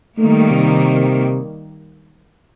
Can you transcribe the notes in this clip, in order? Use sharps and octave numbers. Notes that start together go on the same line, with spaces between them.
D#3 G3 A3 A#3
C3